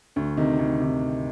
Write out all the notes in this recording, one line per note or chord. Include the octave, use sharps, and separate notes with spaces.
D2
C3 D#3
D2
C3 D#3